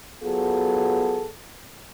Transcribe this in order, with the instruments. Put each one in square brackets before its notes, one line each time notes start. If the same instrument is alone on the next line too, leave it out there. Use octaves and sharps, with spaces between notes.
[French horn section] F#3 B3 F4 G#4 A4